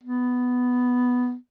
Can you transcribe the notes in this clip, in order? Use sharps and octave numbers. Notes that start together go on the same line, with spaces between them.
B3